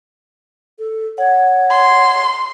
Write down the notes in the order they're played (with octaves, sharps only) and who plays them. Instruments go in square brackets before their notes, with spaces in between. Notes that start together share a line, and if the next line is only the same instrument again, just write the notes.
[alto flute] A4
[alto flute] C#5 [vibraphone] F#5
[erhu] C6